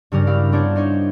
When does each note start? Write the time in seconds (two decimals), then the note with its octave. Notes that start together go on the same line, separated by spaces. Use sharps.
0.12 G2 C#3 G3 A#4
0.27 E4 G4 F5
0.52 B3 C4 D4 G4 C5 C#5
0.76 D#4 C5 C#5